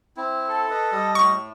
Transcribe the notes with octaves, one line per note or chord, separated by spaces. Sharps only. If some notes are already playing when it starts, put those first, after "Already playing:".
C4 E4
A4
B4 D#5
G3 D#5
A2 C#6